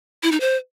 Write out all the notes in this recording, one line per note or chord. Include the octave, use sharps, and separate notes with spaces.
E4
D#4
C5